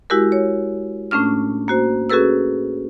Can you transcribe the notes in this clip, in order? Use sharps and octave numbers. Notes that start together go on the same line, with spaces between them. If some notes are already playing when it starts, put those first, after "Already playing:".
G#3 E4 F#4 G4 A#4
C#5
A2 A3 C#4 D4 F6
A#3 F#4 C5
C#4 F#4 G#4 A4 B4 E6